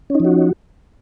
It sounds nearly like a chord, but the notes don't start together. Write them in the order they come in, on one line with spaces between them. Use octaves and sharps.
C#4 D#4 F3 F#4